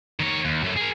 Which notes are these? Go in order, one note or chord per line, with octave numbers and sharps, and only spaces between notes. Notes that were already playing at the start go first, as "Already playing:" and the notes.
D#3 C#5
D#2
F#2 A3
G#4 A#4